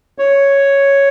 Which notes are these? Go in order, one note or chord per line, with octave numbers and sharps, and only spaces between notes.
C#5